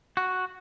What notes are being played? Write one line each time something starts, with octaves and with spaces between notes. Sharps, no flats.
F#4